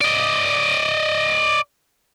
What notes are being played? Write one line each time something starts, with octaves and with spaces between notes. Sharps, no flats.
D5 D#5